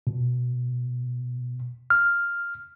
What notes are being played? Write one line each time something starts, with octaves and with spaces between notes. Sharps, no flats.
B2
F6